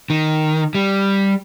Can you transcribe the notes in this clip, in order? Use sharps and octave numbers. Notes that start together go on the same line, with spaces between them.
D#3
G3